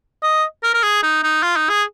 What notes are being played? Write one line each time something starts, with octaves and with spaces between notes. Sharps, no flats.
D#5
A#4
A#4
G#4
D#4
D#4
F4
D#4
G#4